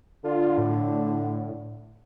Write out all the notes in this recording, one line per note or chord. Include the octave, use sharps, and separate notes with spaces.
D3 F4
A2